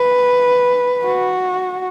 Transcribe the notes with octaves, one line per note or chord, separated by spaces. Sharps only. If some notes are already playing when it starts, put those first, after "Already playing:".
Already playing: B4
F#4